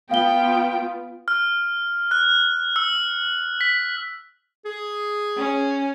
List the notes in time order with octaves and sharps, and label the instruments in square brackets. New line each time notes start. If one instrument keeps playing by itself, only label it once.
[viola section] B3 F4 [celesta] F5 G7 [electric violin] G5
[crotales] F6
F#6
E6
B6
[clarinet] G#4
[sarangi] C#4